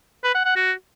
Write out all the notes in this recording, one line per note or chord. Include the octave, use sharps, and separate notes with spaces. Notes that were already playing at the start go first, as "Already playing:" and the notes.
B4
F#5
F#5
F#4